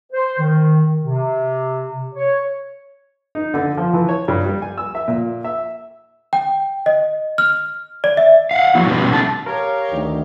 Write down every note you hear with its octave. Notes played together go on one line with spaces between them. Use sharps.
C5
D#3
C3
C#5
D#4
D3
F3
E3
C#5
G2
G3
G#5
E6
E5
A#2
E5
G5
D#5
F6
D5
E5
F5 F#5
F3 F#3 A#3 E4
B2 G3 B3 C#4 G4 B4
B2 D#3 A3 D#4 A5
G4 A#4 C#5 F5
D2 D#3